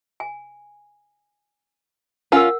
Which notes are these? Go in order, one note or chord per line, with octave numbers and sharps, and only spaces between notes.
G#5
C#4 F4 A#4 F5 F#5